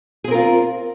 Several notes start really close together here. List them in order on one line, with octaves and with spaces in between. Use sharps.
G#4 C4 A#4 F4